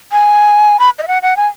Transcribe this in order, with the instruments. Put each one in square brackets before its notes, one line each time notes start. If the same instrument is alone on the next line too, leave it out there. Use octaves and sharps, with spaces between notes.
[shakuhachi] G#5
B5
D#5
E5
F#5
F#5
G#5